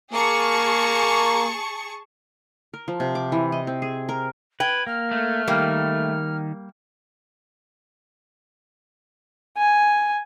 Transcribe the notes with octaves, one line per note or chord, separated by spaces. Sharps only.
A#3 G#4 A5 C#6
A#4
F3
C3
D6
E3
D#5
C4
G#4
A#4
B4 G5 G#6
A#3 F6
A3
D#3 G3 A#3
G#5